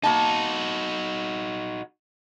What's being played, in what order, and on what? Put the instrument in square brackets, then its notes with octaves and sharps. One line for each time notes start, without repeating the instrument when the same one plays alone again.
[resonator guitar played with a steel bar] A#3 A5 [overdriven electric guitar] D#4 F#4